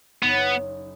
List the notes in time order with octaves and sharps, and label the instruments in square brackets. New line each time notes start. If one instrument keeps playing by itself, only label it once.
[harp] F#1 F#2 F#3 D#4 [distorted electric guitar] B3